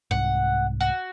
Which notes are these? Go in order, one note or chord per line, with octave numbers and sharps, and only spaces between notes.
C2 G#2 F#5
F#4